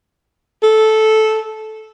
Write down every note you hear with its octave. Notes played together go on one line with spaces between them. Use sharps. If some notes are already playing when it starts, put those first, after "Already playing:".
A4